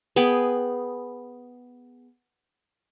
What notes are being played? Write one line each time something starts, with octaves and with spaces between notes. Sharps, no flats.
B3 G#4 G5 B5